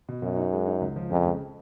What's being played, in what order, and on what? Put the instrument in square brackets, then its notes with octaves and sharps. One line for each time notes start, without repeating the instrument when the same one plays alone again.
[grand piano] B2
[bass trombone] F#2 [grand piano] B2
[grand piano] D#4
G#3
D#4
C#2
F3
[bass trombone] F2 [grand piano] C#3
[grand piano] C#2